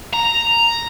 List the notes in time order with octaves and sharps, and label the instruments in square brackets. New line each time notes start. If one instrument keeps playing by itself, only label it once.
[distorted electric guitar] A#5